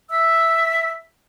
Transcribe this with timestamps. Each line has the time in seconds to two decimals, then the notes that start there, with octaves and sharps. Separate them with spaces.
0.09 E5 E6